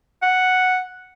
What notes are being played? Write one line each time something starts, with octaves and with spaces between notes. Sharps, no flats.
F#5